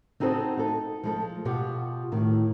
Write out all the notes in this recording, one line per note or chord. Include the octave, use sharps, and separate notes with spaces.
C4 D#4 F#4 G#4 A4 C5
D#4 A4
F3 G#3 A4
B2 F4 G4 F#5
A2 D#3